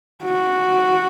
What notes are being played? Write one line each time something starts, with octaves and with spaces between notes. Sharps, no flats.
F#4